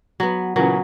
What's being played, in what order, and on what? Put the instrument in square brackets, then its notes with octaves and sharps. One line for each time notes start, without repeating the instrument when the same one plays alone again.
[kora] F#3 B3
[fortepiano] A#2 C#3 E3 [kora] F#3